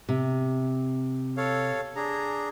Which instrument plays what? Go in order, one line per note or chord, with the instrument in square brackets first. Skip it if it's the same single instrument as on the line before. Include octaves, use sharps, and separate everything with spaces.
[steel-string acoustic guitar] C3
[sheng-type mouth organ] A4 C#5 F5
D4 G#4 A#5